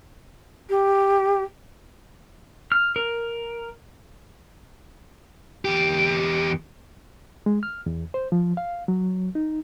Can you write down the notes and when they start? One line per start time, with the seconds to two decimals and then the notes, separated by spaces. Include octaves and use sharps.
0.70 G4
2.72 F6
2.96 A#4
5.65 E2 G4
7.46 G#3
7.63 F6
7.86 E2
8.14 C5
8.32 F3
8.57 F5
8.88 F#3
9.35 D#4